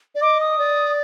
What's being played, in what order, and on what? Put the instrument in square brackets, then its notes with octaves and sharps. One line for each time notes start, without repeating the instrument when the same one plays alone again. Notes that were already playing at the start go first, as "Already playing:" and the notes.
[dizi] D5
[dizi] D#5 [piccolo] D6
[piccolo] D#6
[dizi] D5